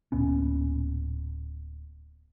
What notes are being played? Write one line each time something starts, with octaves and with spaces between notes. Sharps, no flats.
D1 A#2 B3 C#4